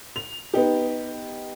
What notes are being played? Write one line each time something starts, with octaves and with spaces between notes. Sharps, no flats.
F7
B3 D#4 G4